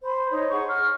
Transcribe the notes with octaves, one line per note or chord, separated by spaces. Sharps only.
C5 B5
D#4 C#5
G#4 F#5 C#6
F6